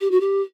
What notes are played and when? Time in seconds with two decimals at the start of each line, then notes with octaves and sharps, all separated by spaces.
0.01 G4
0.11 F#4
0.20 G4